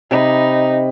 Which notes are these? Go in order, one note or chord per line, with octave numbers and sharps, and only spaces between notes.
C3 D#4 B5